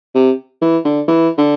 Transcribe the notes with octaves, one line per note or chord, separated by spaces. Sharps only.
C3
E3
D3
E3
D3